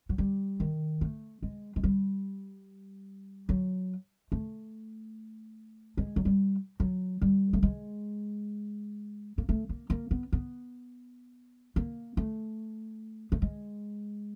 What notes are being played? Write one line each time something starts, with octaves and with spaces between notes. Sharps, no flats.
F#3
G3
D#3
A3
G#3
G#3
G3
F#3
A3
G#3
F#3
G3
F#3
G3
A3
G#3
A#3
A3
A#3
A#3
B3
B3
A#3
A3
A3
G#3